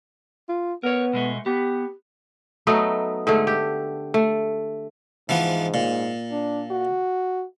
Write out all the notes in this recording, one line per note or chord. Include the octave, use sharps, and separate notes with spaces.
F4
B3 A#4 C#5
B2 G#3 A3
B3 G4
F#3 A3 B3 D#4
G#2 D3 A3
G4
A3
G#2 E3 F3 B3
A#2
D4
F#4